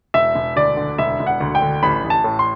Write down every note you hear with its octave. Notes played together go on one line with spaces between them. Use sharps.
E1 E5
E1
D2 D5
D3
E1 E5
E1
F#5
D2
G5
D3
A1 B5
A1
A5
A2
C6